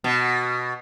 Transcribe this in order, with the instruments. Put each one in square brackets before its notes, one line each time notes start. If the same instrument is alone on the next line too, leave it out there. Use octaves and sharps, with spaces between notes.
[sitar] B2